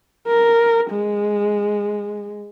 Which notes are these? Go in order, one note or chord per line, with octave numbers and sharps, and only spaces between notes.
A#4
G#3